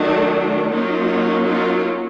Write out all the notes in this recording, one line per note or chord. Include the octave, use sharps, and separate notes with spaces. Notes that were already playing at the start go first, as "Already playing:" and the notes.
Already playing: D#3 F#3 A3 D4 D#4
F#3 A#3 C#4 D#4 F4
D#4 F4